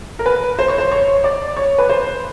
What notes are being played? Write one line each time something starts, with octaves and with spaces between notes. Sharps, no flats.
A#4
B4
C5
C#5
C5
C#5
D5
C#5
B4
C5